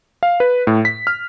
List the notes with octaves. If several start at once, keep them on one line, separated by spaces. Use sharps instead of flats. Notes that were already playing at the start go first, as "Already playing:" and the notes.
F5
B4
A2
B6
F6